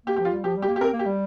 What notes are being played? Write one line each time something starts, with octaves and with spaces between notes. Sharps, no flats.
A#3 G4
F3 G4
F4
G3
F3 G4
G3
G4
A#3
G4
C4 A#4
A#3
G4
G3